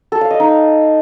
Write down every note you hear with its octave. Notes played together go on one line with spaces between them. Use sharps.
A4
F5
D#5
D#4